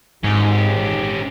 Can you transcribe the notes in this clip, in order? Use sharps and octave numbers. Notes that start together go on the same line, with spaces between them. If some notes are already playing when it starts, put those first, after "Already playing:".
G#1 G#2 C#4 G4